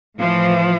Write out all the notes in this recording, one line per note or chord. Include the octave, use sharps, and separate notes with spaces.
A2 E3 F3